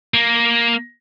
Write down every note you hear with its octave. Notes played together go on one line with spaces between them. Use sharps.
A#3